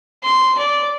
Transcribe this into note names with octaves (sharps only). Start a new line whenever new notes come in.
C6
D5